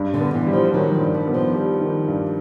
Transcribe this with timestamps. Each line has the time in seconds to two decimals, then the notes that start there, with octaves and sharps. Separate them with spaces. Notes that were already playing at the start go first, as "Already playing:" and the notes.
Already playing: G2
0.14 D3
0.20 B3
0.34 E3
0.47 G3
0.53 F3
0.74 D#3 F#3
0.94 F3
1.01 G2
1.14 G3
1.27 B3
1.34 F3
1.54 G3
1.81 D#3
2.08 G2